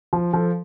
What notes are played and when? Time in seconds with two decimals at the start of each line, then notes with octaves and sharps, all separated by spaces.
0.13 F3
0.33 F3 A4